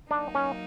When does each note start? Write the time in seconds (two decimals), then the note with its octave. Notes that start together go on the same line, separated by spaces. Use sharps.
0.11 F#3 A#3 D4 D#4
0.35 C#4